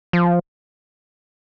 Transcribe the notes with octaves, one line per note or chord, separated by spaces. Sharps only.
F3